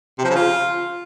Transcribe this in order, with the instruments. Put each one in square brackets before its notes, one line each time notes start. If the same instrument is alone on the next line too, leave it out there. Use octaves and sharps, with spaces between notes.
[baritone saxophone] C3
F3
C#3
F4